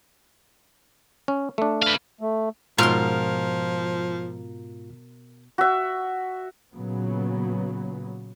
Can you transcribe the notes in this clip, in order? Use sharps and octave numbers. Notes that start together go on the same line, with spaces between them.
C#4
A3 D4
B4 F5
A3
G#2 B2 F3 F4 A#4 C6
F#4 E5
A#2 C#3 F#3 B3